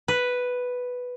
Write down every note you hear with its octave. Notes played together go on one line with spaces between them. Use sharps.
B4